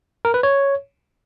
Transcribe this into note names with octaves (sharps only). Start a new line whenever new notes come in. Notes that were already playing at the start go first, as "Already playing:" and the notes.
A#4
B4
C#5